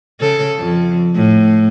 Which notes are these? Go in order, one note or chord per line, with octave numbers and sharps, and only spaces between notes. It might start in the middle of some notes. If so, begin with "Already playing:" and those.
C#3 A4
F2
A2